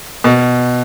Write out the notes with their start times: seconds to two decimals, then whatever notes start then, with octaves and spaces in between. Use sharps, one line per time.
0.24 B2